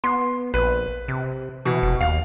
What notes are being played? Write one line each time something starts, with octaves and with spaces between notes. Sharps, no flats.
B3 C6
A#1 B4
C3
B2 E3
F1
D#2 F5